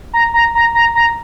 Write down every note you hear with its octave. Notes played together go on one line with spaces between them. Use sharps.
A#5
A#5
A#5
A#5
A#5